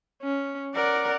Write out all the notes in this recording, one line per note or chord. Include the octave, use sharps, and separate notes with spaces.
C#4
A#4 D5 F#5